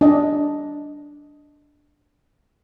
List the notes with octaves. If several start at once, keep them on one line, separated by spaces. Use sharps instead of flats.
D4 D#5